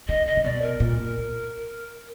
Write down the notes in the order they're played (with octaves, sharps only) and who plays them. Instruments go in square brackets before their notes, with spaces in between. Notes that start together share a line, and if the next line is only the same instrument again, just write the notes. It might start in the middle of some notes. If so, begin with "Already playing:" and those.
[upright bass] D3 [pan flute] D#5
[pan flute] D#5
[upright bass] D3
[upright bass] B2 [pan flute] D5
[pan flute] A#4
[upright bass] A#2